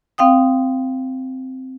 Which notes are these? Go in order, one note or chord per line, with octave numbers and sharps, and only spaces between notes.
C4 F5 G5 D#6